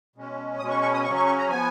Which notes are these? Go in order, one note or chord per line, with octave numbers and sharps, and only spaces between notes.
B2 G#3 C#4
B2 G#3 C#4 D#6
C#6
C#6
D#6
C#3 F#3 C#4 C#6
C#6
C#6
A#5
F3 B3 G#5